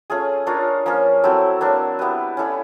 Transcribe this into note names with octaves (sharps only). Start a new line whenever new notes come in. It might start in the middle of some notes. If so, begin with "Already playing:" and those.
A3 C#4 F4 G#4
D4 F4 A#4 C#5
F3 A#3 C#4 F4
F#3 A3 C4 E4
F#3 A#3 D4
B3 E4 G4 B4
C#4 E4 A4 D5